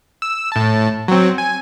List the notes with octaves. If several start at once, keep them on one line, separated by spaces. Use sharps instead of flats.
E6
A2 A5
F#3 C4
G#5